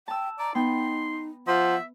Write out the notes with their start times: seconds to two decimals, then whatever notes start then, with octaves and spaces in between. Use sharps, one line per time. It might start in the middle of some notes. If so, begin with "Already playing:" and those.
0.08 G5 A5 E6
0.39 D5 A#5
0.55 B3 D#4 G5 C6
1.47 F3 E5 F#5